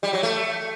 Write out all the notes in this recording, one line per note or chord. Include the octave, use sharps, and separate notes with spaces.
G3
F#3
A3